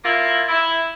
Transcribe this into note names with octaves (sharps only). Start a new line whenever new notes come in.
A#3 E4 F4
E4